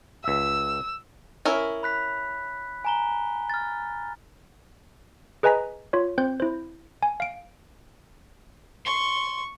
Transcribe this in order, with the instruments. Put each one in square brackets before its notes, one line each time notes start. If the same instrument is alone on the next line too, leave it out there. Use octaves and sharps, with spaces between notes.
[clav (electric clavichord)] C#2 E5 [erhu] E6
[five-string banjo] C#4 E4 A#4
[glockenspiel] B5 F#6 B6
G#5 A#5 G7
F6 A6
[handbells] G#4 B4 D#5 G#5 A#5 B6
F4 C#5
C4 C5 G6
E4 C5
G#5
F5 D7
[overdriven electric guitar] C6 [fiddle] C#6